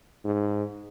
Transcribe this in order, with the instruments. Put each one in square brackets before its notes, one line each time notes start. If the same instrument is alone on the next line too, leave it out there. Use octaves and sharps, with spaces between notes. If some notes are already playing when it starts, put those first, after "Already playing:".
[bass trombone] G#2